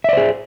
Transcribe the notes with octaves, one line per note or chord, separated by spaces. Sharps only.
G#4 C5 D5 E5